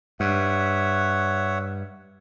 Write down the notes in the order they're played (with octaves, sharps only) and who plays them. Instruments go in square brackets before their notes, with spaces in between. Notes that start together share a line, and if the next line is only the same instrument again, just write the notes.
[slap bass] G2 [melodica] C#5 E5 F#5